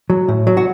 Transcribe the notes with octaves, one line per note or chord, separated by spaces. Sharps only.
F#3
A2
F#3
F#4